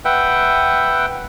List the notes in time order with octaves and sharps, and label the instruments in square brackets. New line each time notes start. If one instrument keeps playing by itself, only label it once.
[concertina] B4 E5 F#5 G5